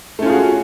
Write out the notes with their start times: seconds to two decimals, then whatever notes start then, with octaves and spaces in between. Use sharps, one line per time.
0.19 A3
0.22 C#4
0.26 F4
0.29 G#4
0.33 F#4